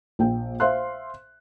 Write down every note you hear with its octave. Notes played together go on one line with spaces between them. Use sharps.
A#1 G5
C5 E5 F5 C6 F#6